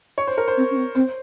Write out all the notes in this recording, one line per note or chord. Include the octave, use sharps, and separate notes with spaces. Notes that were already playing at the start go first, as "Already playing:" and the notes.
C#5
C5
A#4
C5
C4
C#4
C4
C4 C5